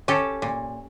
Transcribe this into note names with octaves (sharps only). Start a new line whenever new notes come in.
C#4 G4 A4
A#2